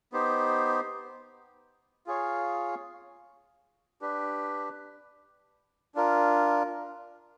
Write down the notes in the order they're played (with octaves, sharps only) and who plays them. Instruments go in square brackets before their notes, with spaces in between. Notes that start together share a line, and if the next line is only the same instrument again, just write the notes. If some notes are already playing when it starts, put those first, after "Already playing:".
[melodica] B3 D#4 G4 C5
F4 G#4 C#5 F5
D4 G4 B4
D4 F4 A#4